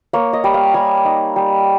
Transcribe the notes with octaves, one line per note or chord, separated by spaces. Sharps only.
A#3 C#5
D#5
G3
F5
G3 G#5
D#4
G3